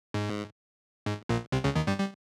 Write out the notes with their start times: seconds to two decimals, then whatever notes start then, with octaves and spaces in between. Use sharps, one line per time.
0.14 G#2
1.06 G#2
1.29 A#1 A#2
1.52 C2 C3
1.64 C#2 C#3
1.75 D#2 D#3
1.87 G2 G3
1.99 G3